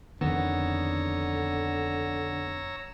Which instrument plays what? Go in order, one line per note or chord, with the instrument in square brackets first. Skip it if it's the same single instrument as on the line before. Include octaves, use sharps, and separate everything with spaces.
[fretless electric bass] F2 D#3 [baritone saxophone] D3 [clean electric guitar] B3 [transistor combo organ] C#5 A#5 E6